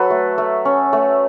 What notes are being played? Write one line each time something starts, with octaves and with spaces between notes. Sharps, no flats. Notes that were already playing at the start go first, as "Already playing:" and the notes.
Already playing: F#3 A4 B4
A3
A3
C#4
A3